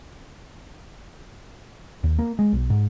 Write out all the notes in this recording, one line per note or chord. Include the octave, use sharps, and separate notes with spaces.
D#2
A#3
G#3
B1
G#2